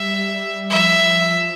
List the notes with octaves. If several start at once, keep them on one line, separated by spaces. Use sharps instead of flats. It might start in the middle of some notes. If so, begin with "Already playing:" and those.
Already playing: G3 E5
F3 E5